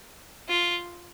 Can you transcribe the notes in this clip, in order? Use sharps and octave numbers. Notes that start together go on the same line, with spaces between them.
F4